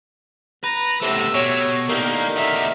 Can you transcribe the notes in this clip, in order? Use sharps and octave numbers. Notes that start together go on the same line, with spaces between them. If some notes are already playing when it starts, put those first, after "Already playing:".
B4 A#5
A2 C3 A3 B3 E6
B2 G4 C#5
A2 D3 D#3 A#3 G4
B3 A#4 E5